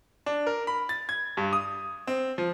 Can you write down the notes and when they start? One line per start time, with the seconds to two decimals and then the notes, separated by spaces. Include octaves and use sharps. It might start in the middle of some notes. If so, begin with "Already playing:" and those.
0.26 D4
0.47 A#4
0.67 B5
0.89 A6
1.09 G#6
1.37 G2
1.53 D#6
2.07 C4
2.38 F3